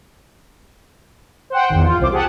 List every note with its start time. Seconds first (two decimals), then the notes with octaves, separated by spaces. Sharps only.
1.50 C5 F#5 G5
1.69 G#1 E2
1.84 F4
1.99 C2 C5 D6
2.12 G4 G#4 F#5 A5